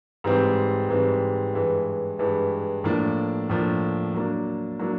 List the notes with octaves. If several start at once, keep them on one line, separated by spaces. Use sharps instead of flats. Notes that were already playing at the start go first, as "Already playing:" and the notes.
G#2 E3 G3 C4
G#2 E3 G3 C4
G2 E3 G#3
G2 E3 G#3
A2 F3 A#3 D4
A2 F3 A#3 D4
F#3 A#3 D4
F#3 A#3 D4